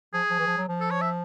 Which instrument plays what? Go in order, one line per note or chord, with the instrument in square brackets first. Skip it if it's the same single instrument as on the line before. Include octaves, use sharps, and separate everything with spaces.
[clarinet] F3 [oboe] G#4
[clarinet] F3
E3
F3
F#3
F3
[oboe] A4
C#5
E5